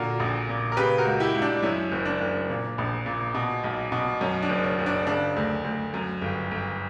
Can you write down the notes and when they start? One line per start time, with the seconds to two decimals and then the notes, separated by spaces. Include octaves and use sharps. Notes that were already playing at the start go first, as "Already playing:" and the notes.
Already playing: A#2 D3 F#4 A#4
0.20 A#1
0.49 A#2
0.72 A#4
0.77 C#3 G4 B4
0.98 F#4 A#4
1.05 C#2
1.20 E4 G4
1.35 C#2
1.42 D4
1.63 F#2 C#4 E4
1.92 F#1
2.05 D4
2.21 F#1
2.50 A#2
2.78 A#1
3.06 A#2
3.34 B2
3.64 B1
3.92 B2
4.21 F#2 C#4
4.43 D4
4.49 F#1
4.64 C#4
4.79 F#1
4.86 D4
5.07 C#3 D4
5.36 D2
5.64 D2
5.94 F#2
6.22 G1
6.51 G1